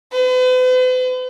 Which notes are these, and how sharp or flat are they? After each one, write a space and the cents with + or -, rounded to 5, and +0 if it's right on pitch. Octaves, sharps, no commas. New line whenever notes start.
B4 +45